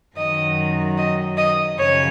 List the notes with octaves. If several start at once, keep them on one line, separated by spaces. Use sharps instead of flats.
F#2 D#3 F#3 D#5
D#5
D#5
F#2 C#3 F3 C#5